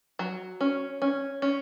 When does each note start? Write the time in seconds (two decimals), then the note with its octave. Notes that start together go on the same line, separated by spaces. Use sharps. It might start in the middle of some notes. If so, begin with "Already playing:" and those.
0.19 F#3
0.61 C#4
1.02 C#4
1.42 C#4